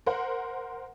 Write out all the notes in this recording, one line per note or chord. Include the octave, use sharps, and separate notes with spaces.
A#4 C5 F#5